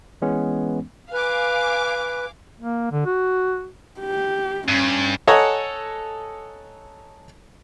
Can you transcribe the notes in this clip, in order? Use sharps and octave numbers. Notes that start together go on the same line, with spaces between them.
E3 G#3 B3 C#4
B4 F5 G#5 D6
A#3
D3
F#4
G4
G2 C#4
A4 C#5 D#5 F#5 G#5 A#5